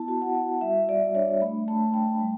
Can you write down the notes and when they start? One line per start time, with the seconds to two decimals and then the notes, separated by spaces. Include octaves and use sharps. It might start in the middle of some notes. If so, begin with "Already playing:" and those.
Already playing: B3 E4 A5
0.08 F#4
0.22 F#5
0.35 F#4
0.61 G3 E5
0.88 G3 D5
1.15 D4 C#5
1.41 A3 B5
1.68 A3 A5
1.94 A3 G5
2.21 G3